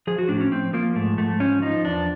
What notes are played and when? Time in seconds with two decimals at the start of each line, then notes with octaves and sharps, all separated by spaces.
0.07 F3 G#4
0.18 F#4
0.29 A2 D4
0.40 C#4
0.51 A2 C4
0.73 F3 A#3
0.95 G#2 A3
1.18 G#2 A3
1.40 F3 C#4
1.62 F3 D#4
1.84 E2 D4